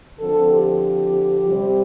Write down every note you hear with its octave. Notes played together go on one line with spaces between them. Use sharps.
D3 F3 C4 A4
G4
C3 G3 C4